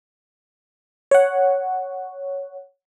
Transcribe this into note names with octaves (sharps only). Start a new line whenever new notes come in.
C#5 F#5